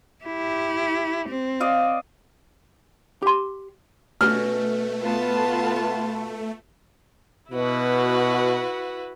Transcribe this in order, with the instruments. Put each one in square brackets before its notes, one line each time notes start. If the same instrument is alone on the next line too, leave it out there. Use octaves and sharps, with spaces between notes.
[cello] E4 G4
C4
[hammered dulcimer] D5 D#5 F5
[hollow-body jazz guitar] G4 C6
[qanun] B2 C#4 D#5 [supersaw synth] A3 [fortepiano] F6
[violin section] B3 F4 A5
[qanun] C#6
[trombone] B2 [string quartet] E4 F#4 B4